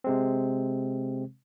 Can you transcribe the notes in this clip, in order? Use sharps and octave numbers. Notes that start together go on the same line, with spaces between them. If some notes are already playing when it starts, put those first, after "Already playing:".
C3 G#3 C4